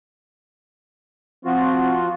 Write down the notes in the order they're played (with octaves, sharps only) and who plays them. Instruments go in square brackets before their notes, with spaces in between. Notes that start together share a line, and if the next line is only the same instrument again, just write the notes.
[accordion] F3 F4 F#4 [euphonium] C4